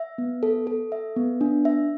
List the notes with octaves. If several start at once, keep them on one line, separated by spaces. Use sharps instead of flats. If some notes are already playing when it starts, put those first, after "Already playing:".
Already playing: E5
B3
A4
A4
E5
B3
D4
E5